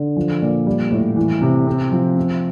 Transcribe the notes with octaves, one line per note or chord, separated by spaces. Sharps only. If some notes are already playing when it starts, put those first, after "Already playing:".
Already playing: D3
F3
A#2
G3
A2
E3
C3
C4
F3
C4